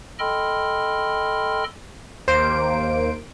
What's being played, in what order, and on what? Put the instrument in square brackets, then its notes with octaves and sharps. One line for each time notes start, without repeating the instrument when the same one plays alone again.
[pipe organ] A4 D#5 G5 B5 C6 F6
[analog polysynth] D#2 A#3 D7 [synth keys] C5